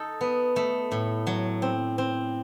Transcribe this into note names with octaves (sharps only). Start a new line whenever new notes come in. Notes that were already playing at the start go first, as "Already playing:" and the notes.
Already playing: D#4 A4
B3
A3
A2
F#3
C4
C4